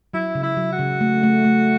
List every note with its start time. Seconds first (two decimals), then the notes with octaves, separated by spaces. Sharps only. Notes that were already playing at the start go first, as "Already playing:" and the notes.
0.14 F#3 E4
0.35 C#3
0.43 E4
0.57 F#3
0.72 F#4
0.79 C#3
1.01 A3
1.23 A3
1.44 A3